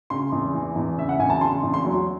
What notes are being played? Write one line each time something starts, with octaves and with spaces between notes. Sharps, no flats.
C#3 C6
E2
E3
E2
C#3 E5
F#5
E2 G#5
A5
C#3 C6
E2
C6
F#3